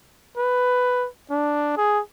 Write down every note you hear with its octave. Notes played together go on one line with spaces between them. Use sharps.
B4
D4
G#4